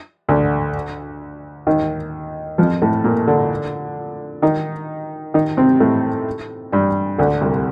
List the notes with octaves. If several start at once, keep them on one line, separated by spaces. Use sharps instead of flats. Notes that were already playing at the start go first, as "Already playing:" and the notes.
D2 D3
D#2 D#3
F2 F3
A2 A3
A#2 A#3
D3 D4
D#3 D#4
D#3 D#4
C3 C4
A2 A3
G2 G3
D2 D3
C2 C3